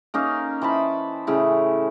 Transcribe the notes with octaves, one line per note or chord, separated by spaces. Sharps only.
A#3 C#4 D#4 F5
E3 C5 A5 B5
A2 C#3 E4